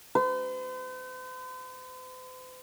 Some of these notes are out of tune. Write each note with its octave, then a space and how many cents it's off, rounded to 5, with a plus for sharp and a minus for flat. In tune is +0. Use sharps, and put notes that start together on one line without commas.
C5 -45